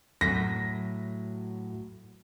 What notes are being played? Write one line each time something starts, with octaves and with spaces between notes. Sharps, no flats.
A2 F#3 A#6 B6